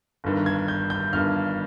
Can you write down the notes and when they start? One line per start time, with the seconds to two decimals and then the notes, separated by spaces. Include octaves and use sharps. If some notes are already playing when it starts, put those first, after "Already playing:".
0.24 G1 G2 D#3
0.46 G#6
0.68 G6
0.90 G6
1.13 G1 G2 D#3 F6